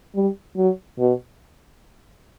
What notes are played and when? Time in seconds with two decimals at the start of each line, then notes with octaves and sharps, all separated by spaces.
0.15 G3
0.57 F#3
0.99 B2